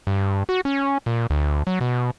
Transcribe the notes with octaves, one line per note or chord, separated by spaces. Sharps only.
G2
F#4
C#4
A#2
D2
F#3
B2